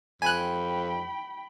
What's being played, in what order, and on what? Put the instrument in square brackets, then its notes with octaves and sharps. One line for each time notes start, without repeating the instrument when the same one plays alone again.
[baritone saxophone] F2 [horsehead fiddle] G5 B5 [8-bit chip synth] G#5 F#6